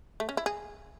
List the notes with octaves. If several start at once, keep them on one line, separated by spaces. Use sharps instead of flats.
A3
C#4
E4
G#4